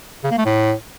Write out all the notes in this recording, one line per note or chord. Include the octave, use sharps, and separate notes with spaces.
C#3
A#3
A3
A2